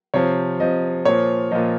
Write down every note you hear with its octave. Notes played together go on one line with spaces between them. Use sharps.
C3 F3 C#5
C3 F3 D#5
A#2 F3 C#5
A#2 F3 D#5